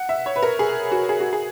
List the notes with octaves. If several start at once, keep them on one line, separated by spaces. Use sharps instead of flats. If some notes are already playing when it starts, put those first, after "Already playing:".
Already playing: F#5
E5
C#5
B4
A#4
G#4
F#4
G#4
F#4
G#4